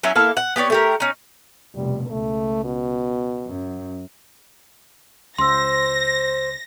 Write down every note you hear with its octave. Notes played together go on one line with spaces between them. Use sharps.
F#3 C#4 E4
A#3 E4 A4 F5
F#5
B3 G4 C#5 D5
A3 G4 A#4
C#4 D#4
F1 B2 G3
C#2 A3
B2
F#2
C#2 C5 C6 E6 A#6